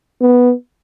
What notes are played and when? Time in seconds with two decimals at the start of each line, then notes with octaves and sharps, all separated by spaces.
0.21 B3